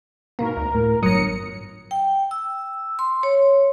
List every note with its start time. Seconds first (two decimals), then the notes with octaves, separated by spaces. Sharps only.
0.39 G#2 B2 A#3 A#4
0.57 D2
0.75 A2
1.03 G1 A#2 F#3 A#5 D#6 C#7
1.91 G5
2.31 E6
2.99 C6
3.23 C#5